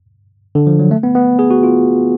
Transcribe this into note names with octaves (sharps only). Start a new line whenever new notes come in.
D3
F3
F#3
A3
B3
B3
G#4
F#4
F4